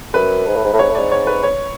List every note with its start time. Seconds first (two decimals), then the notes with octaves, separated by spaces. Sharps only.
0.14 F#2 B4
0.47 G#2
0.56 A2
0.64 G#2
0.73 A2
0.79 G#2 C#5
0.90 A2
0.95 G#2 D5
1.12 C#5
1.27 B4
1.43 C#5